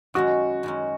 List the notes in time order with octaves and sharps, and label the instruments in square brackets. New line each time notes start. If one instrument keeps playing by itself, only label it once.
[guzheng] F#2 D#3 G#3 C#4 [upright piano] F#4
[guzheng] F#2 D#3 G#3 C#4